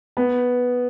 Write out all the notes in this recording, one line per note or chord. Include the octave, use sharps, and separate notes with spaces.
B3